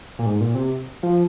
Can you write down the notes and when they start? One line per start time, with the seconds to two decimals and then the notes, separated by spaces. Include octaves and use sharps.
0.19 A#2
0.26 G#2
0.41 A#2
0.55 C3
1.03 F3